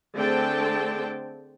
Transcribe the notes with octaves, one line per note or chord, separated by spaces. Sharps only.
D3 A3 C4 G#4 G5 A5